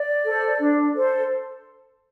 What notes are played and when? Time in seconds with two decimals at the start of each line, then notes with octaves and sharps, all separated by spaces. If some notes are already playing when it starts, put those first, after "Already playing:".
Already playing: D5
0.24 A4 C5
0.59 D4
0.94 A4 C5